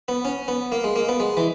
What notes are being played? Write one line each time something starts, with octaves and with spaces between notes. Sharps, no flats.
B3
C#4
B3
A#3
G#3
A#3
B3
G#3
E3